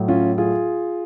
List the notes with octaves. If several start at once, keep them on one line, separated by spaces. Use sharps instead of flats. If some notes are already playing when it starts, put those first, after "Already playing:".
Already playing: A2 F#3
C#4 F4
F4 G#4